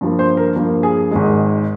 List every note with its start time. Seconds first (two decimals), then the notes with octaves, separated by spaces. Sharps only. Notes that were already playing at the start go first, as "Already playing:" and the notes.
0.01 G2 F3 A#3
0.19 C5
0.37 A#4
0.56 G2 F3 A#3
0.83 G#4
1.11 G#1 G#2 D#3 G#3